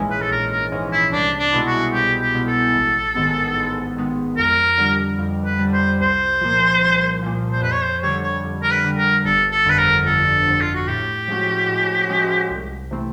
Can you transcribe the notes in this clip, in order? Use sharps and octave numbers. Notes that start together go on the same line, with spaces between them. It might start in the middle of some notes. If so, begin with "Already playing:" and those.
Already playing: A#1 G#2 E3 G#3 C#4
B4
A4
A#1 A#4
A#4
G#2 E3 G#3 C#4
E4
C2 D4
D4
B2 G#3 B3 E4
F#4
C2 G4
G4
B2 G#3 B3 E4
A4
A1
G#2 D#3 G#3 B3
A1
G#2 D#3 G#3 B3
F2 A#4
D3 G3
F2
B4
D3 G3
C5
C2 C5
A#2 F3
C2
A#2 F3
C5
F2 B4
C#5
C5
D3 G3 C#5
C#5
F2
A#4
B4
D3 G3
A#4
G1 A4
A4
F2 D3 B4
A#4
G1 A4
F2 D3
F4
F#4
A2 G4
F3 G#3 C#4 F#4
A2
F3 G#3 C#4 F#4
C2
C3 E3 A3 C4